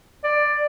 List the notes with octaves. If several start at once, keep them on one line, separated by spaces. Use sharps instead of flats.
D5